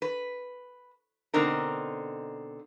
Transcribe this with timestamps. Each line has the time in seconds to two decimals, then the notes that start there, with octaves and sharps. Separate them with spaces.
0.02 B4
1.34 B2 D3 C4 D#4 A#4